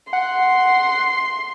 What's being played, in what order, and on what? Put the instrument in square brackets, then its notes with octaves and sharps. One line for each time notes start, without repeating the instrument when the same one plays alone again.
[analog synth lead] F#5 [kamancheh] C6